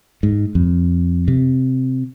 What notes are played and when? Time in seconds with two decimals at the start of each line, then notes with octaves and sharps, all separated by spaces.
0.23 G#2
0.55 F2
1.28 C3